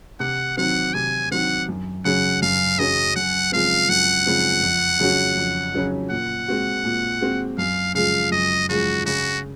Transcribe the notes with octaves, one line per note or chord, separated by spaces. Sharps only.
C3 F#5
D#3 F#3 C4 F#5
C3 G#5
D#3 F#3 C4 F#5
F#2
C#3 F#3 C#4 F#5
F#2 F5
C#3 F#3 C#4 D#5
F#2 F#5
C#3 F3 G#3 C4 F5
F#2 F#5
C#3 F3 G#3 C4
F2
C#3 F#3 C#4 F#4
F2
C#3 F#3 C#4 F#4
A#2 F#5
G#3 C4 F#4
A#2
G#3 C4 F#4
F#2 F5
C#3 F3 G#3 F5
F#2 D#5
C#3 F3 G#3 F#4
C#3 F#4